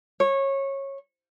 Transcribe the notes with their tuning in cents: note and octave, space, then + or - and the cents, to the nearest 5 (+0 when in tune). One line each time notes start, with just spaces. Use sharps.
C#5 -20